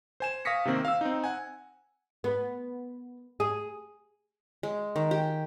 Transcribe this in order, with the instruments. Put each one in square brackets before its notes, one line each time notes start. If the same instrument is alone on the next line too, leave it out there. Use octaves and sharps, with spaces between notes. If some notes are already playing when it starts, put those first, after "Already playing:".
[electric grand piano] C5 G#5 E7
F5 C#6 D#6 A#6 B6 C#7
C3 D#3 A#3 C4
F5 E6
C4 D#4
F#5 G#5
[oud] B3
G#4
[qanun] G#3
D#3
G4